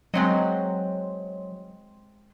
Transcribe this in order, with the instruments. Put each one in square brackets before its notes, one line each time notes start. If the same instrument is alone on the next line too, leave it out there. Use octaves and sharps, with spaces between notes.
[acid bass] F#3 [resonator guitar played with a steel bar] G#3 C4 D#5